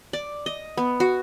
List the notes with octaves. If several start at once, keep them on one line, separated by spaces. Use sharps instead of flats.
D5
D#5
B3
F#4